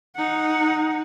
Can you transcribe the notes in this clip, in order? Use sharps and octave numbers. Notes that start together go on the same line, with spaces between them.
D#4 F#5